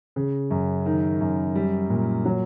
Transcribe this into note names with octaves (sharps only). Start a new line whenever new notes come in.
C#3
F#2
D#3
F#2
G3
A#2
F#3